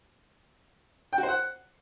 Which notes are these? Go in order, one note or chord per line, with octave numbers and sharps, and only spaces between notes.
G5
F#4
C5
F#5